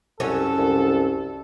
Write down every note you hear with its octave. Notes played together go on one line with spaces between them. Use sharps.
C2 F#2 C#4 A4
C2